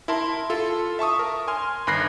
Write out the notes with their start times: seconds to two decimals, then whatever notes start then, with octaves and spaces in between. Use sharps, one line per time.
0.08 E4 A#4 A5 C6
0.50 F4 A4
0.99 E5 A5 C#6 D#6
1.19 A#4
1.48 G#5 C6 F6
1.87 G1 D#3 B5 F#6 A#6 C7